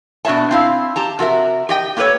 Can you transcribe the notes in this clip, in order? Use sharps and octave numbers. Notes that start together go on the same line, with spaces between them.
B2 D4 F#4 C#5 E5 A5
C4 E4 F5
G4 A5 A#5
C3 F#4 A#4 E5
G4 D#5 G5
A#3 G4 A4 B4 C#5